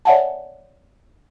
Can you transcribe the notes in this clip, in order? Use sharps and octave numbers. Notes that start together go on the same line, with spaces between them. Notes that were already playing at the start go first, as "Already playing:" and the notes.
C#5 D5 E5 F#5 G#5 A5